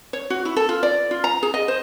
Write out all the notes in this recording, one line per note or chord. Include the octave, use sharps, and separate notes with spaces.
C#5
F#4
E4
A4
F4
D5
F4
A#5
G#4
D#5
C5